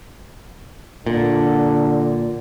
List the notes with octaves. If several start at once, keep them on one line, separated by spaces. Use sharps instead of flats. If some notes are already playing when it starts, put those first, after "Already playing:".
A#2 D3